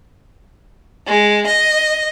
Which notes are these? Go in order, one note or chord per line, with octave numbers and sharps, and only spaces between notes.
G#3
D#5